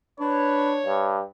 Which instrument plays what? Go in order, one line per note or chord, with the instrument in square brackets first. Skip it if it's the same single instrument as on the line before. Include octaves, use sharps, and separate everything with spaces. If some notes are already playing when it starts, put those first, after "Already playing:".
[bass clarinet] D4 [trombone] B4 [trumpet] C#5
[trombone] G2